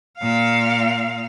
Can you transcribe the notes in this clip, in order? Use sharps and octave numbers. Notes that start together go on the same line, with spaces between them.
A#2 F5